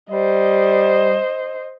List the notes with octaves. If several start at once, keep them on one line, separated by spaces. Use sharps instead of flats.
G3 C5 D#5